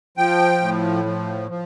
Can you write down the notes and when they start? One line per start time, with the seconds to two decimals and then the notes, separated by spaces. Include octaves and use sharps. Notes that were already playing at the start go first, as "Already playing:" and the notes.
0.17 F3 G5
0.61 A2
1.05 F3
1.49 F3